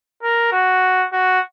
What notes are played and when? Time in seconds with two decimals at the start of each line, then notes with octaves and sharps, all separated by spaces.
0.23 A#4
0.52 F#4
1.13 F#4